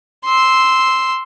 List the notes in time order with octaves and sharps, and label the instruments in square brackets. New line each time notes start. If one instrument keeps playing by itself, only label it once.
[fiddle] C6 E6